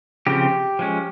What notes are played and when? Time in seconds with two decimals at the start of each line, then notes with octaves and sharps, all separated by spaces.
0.27 C#3 F3 C4 G4
0.79 F3 G#3 C#4